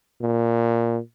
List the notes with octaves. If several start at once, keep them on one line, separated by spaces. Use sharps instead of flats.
A#2